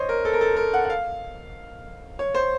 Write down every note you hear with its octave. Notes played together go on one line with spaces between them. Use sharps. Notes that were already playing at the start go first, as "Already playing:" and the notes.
Already playing: C5 C#5 D#5
A#4
A4
A#4
A4
A#4
F#5
F#5
F5
C#5
C5